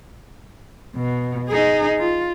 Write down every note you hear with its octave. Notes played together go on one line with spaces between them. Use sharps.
B2
D#4 G#4
F4